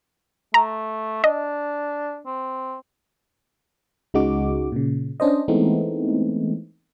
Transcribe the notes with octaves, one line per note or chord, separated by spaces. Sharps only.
A3 A#5
D4 D#5
C4
C#2 C#3 G#3 D#4 F#4 D6
A#2 C#3
C#4 D4 C5 D#5
E3 G#3 A3 B3 C4 D#4